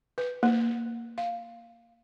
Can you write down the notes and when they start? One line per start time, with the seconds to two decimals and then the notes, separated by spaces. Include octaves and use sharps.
0.18 B4
0.43 A#3
1.18 F5